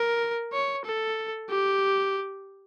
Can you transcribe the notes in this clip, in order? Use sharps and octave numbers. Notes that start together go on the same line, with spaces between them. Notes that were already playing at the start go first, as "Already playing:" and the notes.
Already playing: A#4
C#5
A4
G4